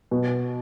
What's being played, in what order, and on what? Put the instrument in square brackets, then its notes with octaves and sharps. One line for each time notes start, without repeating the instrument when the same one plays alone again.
[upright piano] B2